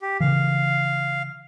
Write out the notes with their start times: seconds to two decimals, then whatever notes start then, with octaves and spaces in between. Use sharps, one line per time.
0.02 G4
0.20 C#3 E3 F5